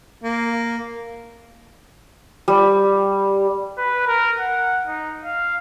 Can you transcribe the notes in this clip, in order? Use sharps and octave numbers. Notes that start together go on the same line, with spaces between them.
A#3
G3
B4
A#4
F#5
D#4
F5